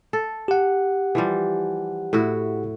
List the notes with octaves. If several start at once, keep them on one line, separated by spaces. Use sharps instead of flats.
A4
G4 F#5
E3 F3 G3
A2 E4 F#4